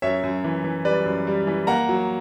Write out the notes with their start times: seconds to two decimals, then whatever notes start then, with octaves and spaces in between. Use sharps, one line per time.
0.02 F#2 C#5 E5
0.24 F#2
0.44 E3
0.64 E3
0.85 G3 B4 D5
1.06 F#2
1.27 G3
1.47 E3
1.67 A#3 F#5 A#5
1.89 F#3